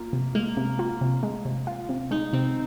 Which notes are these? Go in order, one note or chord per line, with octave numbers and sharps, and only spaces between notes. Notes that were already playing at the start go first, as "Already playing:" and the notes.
Already playing: A#3 F4
C3
G#3 A#3
C3
F4
C3
G#3
C3
F4
C3
G#3 D#4
C3 C4